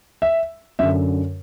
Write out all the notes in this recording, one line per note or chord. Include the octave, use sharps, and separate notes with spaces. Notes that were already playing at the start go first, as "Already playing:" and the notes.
E5
F#2 D3 E5